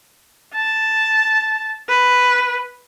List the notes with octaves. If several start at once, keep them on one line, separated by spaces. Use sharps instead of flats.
A5
B4